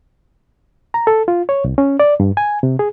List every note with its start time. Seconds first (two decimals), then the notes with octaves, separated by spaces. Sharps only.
0.94 A#5
1.07 A4
1.28 F4
1.49 C#5
1.64 C2
1.78 C#4
2.00 D5
2.20 G2
2.37 G#5
2.63 C3
2.79 G#4